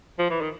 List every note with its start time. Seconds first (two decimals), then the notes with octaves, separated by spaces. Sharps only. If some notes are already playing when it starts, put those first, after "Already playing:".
0.19 F3
0.31 E3
0.42 D#3